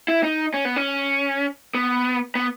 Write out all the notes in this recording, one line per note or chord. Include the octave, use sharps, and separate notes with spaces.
E4
D#4
C#4
B3
C#4
B3
B3